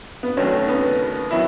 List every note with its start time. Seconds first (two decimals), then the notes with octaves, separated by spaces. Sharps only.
0.23 B3
0.37 D#2 D#3 F#3 A3 C#4
0.68 B3
1.31 D#3 F#3 B3 E4